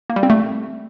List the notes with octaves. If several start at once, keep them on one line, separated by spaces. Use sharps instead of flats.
A#3
G3
C4
A3